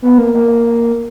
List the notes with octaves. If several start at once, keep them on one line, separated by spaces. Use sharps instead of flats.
B3
A#3
A#3